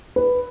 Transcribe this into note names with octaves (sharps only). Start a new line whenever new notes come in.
B4